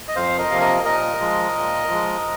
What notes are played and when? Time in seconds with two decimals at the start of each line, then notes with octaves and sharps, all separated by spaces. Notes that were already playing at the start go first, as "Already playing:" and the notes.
0.08 D#5
0.16 F2 C5 F5
0.39 A#4 D#5
0.50 C3 F3 A#3 F5
0.61 A#4 D#5
0.85 A#2 A#4 D#5
1.20 F3 G#3
1.56 A#2
1.90 F3 G#3